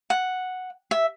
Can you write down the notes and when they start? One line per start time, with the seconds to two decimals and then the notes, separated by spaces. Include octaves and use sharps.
0.10 F#5
0.91 E5